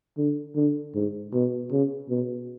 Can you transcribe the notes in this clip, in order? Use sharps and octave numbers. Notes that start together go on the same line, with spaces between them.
D3
D3
G#2
B2
C#3
B2